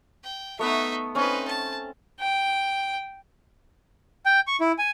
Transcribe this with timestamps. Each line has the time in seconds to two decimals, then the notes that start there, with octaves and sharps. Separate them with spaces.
0.23 G5
0.59 A3 B3 D#4 B4 E5
1.15 C4 C#4 D#4 B4
1.47 A5
2.20 G5
4.26 G5
4.47 C#6
4.61 E4
4.79 G#5